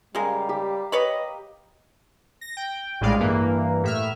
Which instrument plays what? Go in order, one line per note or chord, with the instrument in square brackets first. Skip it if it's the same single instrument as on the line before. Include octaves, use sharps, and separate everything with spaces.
[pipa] C#3 G#3 [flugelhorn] G3 [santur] G4 A#4 F5
[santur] G4
[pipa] B4 C#5 B5 [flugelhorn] D#5
[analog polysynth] A#6
G5
A#1 A2 G3 G#3 D5 F5
G2 E3 A#3
A2 E5 F6